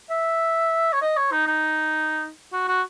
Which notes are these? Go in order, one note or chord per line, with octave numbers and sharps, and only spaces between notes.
E5
C#5
D#5
C#5
D#4
D#4
F#4
F#4